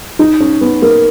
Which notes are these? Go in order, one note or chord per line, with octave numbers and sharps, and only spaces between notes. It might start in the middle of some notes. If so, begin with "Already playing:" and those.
D#4
C#4
B3
A#3